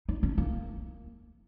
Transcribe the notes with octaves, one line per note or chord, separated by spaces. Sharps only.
D#4
C#4
A#3